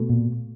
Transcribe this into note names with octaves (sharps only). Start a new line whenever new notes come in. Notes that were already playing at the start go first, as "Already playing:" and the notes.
Already playing: B2 A3
A#2